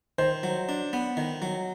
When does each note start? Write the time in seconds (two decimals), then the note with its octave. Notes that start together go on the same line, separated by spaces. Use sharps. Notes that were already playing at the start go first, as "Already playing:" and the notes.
0.18 D#3 C5
0.43 F#3
0.69 D4
0.93 B3
1.17 D#3
1.42 F#3